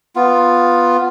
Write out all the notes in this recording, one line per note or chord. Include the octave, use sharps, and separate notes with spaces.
B3 F4